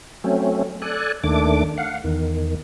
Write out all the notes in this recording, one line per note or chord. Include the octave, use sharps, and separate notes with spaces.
F#3 A3 C4 C#4
A4 D5 G#5 F#6
D#2 D#3 A3 D4 D6
F5 F#5
E2 D#3